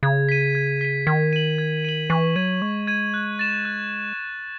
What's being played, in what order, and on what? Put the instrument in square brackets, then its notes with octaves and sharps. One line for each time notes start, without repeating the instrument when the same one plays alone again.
[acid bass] C#3 [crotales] G#6
[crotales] B6 D#7
G#6
B6 D#7
[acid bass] D#3 [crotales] G#6
[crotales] D#7 F#7
G#6
D#7 F#7
[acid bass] E3 [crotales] C#6
[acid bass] F#3 [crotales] G#6 D#7
[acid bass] G#3 [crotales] C#6
[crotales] G#6 D#7
F#6
A6 E7
F#6